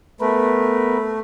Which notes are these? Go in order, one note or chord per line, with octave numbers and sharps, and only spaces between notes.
A3 B3 A#4 B4